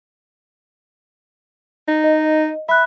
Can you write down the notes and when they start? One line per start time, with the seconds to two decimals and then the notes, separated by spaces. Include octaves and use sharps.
1.88 D#4
2.04 D#5
2.69 E5 B5 F#6